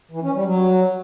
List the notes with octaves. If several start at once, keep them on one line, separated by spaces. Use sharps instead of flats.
E3
C#4
G3
F#3